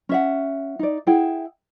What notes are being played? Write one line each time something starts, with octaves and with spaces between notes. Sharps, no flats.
C#4 E5 F#5
D#4 D5
E4 G#4 F#5 G5